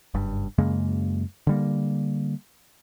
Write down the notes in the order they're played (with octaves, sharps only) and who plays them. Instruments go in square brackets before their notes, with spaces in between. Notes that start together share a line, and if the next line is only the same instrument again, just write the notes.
[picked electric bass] F#1 G2
F#2 C#3 G#3 A#3
D3 G3 A#3